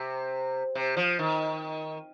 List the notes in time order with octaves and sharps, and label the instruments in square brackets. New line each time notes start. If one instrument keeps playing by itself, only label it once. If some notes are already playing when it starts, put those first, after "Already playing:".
Already playing: [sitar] C3
C3
F3
D#3